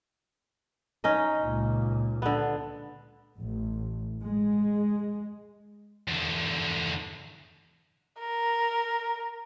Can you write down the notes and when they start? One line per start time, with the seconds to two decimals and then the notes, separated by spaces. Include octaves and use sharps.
1.04 C#4 D#4 D#5
1.41 C#2 A#2
2.22 D3 B3
3.36 A1
4.22 G#3
6.08 E2 D3
8.19 A#4